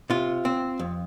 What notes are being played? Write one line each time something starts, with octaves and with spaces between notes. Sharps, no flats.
C3 F4
C4
F2